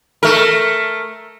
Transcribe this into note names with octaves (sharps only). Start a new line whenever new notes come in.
A3 A#4